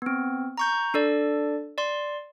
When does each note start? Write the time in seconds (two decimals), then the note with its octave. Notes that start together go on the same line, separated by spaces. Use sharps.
0.02 B3 C4
0.58 A#5 C#6 G6
0.94 D4 A4 D5
1.78 D5 C6